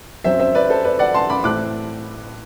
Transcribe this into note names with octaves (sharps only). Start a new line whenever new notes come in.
F#2 F#3 C4 C5 E5
C5 E5
B4 D5
A4 C5
B4 D5
D5 F#5
A5 C6
B5 D6
A2 E3 A3 C4 D6 F#6